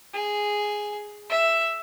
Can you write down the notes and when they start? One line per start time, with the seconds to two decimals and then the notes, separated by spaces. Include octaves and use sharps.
0.14 G#4
1.30 E5